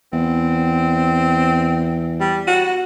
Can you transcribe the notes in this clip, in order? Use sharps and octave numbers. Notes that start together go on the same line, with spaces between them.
E2 C4
G3
F#4